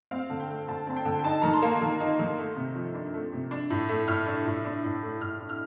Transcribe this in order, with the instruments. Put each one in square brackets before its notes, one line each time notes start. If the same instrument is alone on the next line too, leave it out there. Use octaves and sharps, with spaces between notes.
[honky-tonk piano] C4 F5
D3
G5
A3
D3 A5
C4 A5
G5
D3
G5
D#4 A5
D#3 A#5
C6
A#3
D#3
D#4
D#3
A3
C3
F3
D4
A3
C3
D4
A2
A3
A2 F6
D4
A2
D4
A2
A3
A2 F6
D4
F6